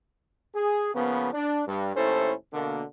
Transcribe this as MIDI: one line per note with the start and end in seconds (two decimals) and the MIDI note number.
0.55 0.94 68
0.95 1.31 49
0.95 1.31 53
0.95 1.31 58
0.95 1.31 59
1.33 1.63 62
1.67 1.94 43
1.96 2.33 39
1.96 2.33 45
1.96 2.33 61
1.96 2.33 64
1.96 2.33 69
1.96 2.33 72
2.53 2.83 47
2.53 2.83 50
2.53 2.83 58